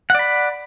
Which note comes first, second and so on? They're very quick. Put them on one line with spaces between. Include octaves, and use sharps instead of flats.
F#5 D5 B5